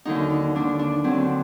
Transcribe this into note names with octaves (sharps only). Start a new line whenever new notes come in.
D#2 D3 F#3 D#4
D#4
D#2 D3 F#3 D4
D4
D#2 D3 F#3 C4